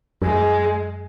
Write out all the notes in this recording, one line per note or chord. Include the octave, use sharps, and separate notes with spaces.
F#2 G#3